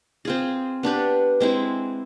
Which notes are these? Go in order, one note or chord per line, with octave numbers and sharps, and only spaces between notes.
C4 F4 G#4
B3 D4 G4 B4
G#3 C4 E4